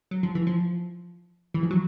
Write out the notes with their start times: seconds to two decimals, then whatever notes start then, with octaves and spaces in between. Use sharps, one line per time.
0.11 F#3
0.23 F3
0.35 E3
0.47 F3
1.54 E3
1.63 F3
1.71 F#3